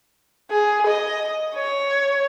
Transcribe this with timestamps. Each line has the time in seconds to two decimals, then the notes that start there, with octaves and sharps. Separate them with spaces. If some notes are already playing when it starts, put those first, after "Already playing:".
0.51 G#4
0.87 D#5
1.55 C#5